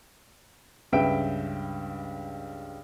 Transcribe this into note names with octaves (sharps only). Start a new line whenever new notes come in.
C#2 G2 B4 E5 G5 D7